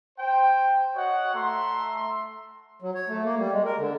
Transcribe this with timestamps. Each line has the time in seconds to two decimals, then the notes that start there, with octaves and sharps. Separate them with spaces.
0.19 C5 G5
0.95 F#4 C#5 D#5 F#5
1.34 A3 E5 A#5 C6
2.82 F#3
2.95 C#5
3.08 A3
3.25 A#3
3.39 G3
3.52 G#3
3.65 A#4
3.78 D3